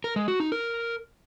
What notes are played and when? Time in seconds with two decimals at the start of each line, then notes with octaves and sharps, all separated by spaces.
0.04 A#4
0.16 G#3
0.28 F#4
0.40 D#4
0.52 A#4